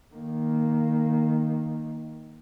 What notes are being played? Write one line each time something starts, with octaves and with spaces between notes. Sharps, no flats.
D#3 A#3